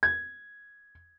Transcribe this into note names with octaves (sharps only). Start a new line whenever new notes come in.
G#6